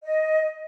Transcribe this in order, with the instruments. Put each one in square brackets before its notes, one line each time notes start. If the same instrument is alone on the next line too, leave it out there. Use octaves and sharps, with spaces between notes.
[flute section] D#5